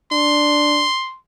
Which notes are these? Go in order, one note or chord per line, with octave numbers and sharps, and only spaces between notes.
D4 C6